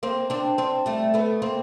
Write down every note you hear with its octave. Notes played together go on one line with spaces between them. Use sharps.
A#3 C4
C4 D4
C4 D4
G3 A3
A3 B3
A#3 C4